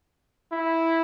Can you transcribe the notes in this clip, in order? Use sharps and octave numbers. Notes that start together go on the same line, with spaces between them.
E4